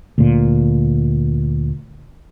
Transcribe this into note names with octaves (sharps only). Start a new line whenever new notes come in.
D2 A#2